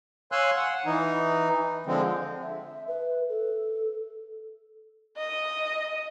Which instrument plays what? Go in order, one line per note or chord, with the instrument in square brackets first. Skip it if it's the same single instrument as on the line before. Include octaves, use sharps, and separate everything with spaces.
[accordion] C#5 F5 G#5 C6 E6 F#6
F#5
E3 D#4
D3 F3 G#3 C4
[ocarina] E5
B4
A4
[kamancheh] D#5